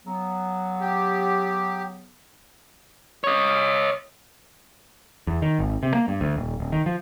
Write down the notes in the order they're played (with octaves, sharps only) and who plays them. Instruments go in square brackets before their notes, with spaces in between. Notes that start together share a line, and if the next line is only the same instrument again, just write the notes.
[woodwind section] C#3 F#3 B3
[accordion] G4
[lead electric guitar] C#5 D#5
[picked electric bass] E2
D#3
G#1
C3
A#3
G2
D2
D#1
D1
D#3
F3